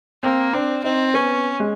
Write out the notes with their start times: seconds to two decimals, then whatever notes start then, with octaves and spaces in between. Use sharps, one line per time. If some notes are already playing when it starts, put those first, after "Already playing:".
0.23 A#3 C4
0.53 C4 D4
0.84 C4 D#4
1.14 B3 C#4
1.60 G#3